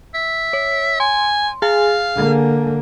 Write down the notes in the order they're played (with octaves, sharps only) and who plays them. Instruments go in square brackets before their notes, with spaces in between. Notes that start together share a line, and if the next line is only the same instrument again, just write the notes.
[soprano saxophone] E5
[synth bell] C#5
[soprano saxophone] G#5 [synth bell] C6
[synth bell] G#4 G#5 [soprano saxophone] F5
[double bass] D3 A#3